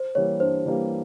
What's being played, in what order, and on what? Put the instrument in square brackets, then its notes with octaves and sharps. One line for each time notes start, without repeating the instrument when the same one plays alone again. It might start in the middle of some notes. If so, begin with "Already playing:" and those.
Already playing: [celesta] C5
[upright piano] E3 G3 A#3 [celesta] C#5
[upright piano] G2 [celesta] C5
[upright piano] E3 G3 A#3